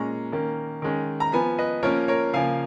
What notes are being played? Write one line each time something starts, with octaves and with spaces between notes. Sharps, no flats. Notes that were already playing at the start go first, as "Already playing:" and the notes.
Already playing: A#2 G#3 C#4 A#5 C#6
D#3 A#3 C#4
D#3 G#3 C#4
A#5
F3 B3 G#5 B5
B4 D#5
F3 A#3 C#4 A#4 C#5
A#4 C#5
C#3 F3 A#3 F5 G#5